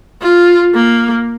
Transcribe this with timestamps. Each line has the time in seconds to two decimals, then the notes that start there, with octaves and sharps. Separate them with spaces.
0.22 F4
0.74 A#3